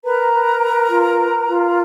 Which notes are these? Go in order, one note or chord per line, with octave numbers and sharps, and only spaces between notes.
A#4 B4 A#5
B4
B4
F4
B4
F4